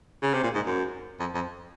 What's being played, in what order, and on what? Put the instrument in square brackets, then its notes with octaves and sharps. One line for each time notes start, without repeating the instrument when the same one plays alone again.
[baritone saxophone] C#3
C3
A#2
G#2
F#2
F2
F2